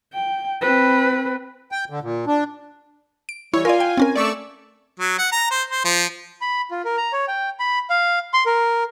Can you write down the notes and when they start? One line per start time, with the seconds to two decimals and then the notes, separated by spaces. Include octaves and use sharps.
0.13 G5
0.62 C4 B4
1.72 G5
1.90 D3
2.02 A#2
2.27 D4
3.29 D7
3.54 E3 G3 E4 C#5
3.65 F4 A#4 D5 G#5
3.80 G5
3.97 C4 C#4 A#4
4.16 A3 D5 C#6 E6
5.00 F#3
5.18 F#5
5.32 A#5
5.51 C5
5.70 C5
5.85 F3
6.41 B5
6.71 F4
6.85 A#4
6.97 A#5
7.13 C#5
7.28 G5
7.59 B5
7.90 F5
8.34 C6
8.46 A#4